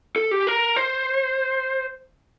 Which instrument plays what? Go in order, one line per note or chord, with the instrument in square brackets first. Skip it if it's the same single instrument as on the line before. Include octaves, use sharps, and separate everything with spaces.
[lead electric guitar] A4
G4
A#4
C5